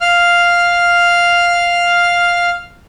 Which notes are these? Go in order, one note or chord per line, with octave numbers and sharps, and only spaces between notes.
F5 F6